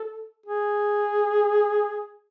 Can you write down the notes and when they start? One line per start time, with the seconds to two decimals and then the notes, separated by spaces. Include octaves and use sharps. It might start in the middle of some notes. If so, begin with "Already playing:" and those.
Already playing: A4
0.46 G#4